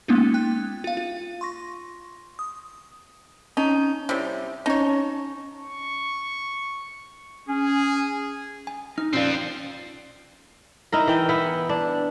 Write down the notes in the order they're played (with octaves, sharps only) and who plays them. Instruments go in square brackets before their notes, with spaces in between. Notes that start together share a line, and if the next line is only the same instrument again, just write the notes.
[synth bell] G#3 A#3 B3 C#4 D#4 F4
G5 F#6
F4 F5
F4
C6 C#6 A#6
D#6
[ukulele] C#4 A5 [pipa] D#4
[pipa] C3 G3 [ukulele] E4 C#5
[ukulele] C#4 A5 [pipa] D#4 C#5
[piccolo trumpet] C#6
[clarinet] C#4 [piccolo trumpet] G#4
[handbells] G#5
[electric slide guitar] D#4 [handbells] F6
[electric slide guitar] A#2 D5 [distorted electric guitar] F3 C4 [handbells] C#4 F4 F5
[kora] D#4 E4 A#4
E3 G5
B3 E4
D4